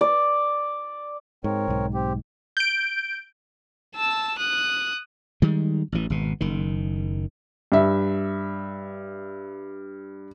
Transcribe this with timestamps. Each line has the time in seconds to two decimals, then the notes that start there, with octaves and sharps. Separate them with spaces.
0.01 D5
1.44 G#2 C4 A#4 C#5
1.68 B1 G#2
1.94 C4 G4
2.57 G6 D7
3.96 A5 E6
4.38 D#6 F#6
5.42 D#3 G3 G#3
5.92 A1 E3
6.10 G#1 B2
6.41 F#1 D#3
7.72 G2 E5